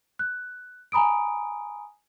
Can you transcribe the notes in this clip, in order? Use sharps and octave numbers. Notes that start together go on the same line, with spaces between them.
F#6
G#5 A#5 B5 D#6 D7